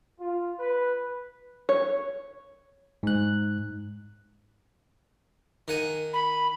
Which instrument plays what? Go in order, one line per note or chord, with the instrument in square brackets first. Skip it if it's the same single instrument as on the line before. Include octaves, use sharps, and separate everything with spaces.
[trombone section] F4
B4
[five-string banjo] C#5
[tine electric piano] G#2 F#6
[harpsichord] D#3 F#5 G#5
[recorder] B5